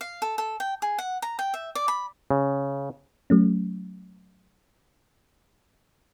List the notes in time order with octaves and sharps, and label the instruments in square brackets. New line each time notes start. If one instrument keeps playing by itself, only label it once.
[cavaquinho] F5
A4
A4
G5
G#4
F#5
A#5
G5
E5
D5
B5
[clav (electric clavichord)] C#3
[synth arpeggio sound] F#3 A3 C#4